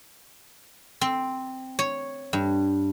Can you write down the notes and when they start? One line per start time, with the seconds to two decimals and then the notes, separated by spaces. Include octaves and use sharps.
1.01 C4
1.79 C#5
2.33 G2